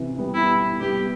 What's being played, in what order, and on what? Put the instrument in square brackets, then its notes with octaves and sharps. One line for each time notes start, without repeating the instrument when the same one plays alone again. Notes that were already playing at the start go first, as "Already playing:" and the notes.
Already playing: [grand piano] C3 E3
G3 B3
[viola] E4
[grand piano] G3 B3 [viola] G4